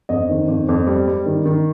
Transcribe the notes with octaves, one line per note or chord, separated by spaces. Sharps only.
F2 D#5
D#3
F2
F2
G3
G3
D#3
D#3